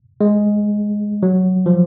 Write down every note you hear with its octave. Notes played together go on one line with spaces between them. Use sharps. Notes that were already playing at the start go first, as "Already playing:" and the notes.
G#3
F#3
F3